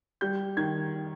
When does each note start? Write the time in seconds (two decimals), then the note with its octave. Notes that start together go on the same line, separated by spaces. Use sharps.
0.21 G3 G6
0.57 D#3 G#6